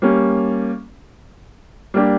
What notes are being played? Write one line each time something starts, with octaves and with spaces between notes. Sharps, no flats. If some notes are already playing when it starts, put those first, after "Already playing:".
G3 A#3 C#4
G3 A#3 D4 G4